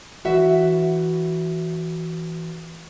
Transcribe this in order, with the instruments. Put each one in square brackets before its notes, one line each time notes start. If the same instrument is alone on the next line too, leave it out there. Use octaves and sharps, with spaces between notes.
[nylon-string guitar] E3 F#4 E5